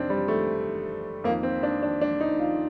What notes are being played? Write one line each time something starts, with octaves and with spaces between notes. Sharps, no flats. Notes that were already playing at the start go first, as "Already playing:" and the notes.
Already playing: F2 C3 D#3 C4 D4
G3
A3
F2 D#3 A#3
C4
D4
D4
D4
D#4
F4